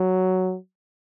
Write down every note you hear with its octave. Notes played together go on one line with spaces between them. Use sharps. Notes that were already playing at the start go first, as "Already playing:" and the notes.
Already playing: F#3